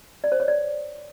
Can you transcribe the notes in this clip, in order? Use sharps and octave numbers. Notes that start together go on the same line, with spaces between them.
D5
C5
C#5
D5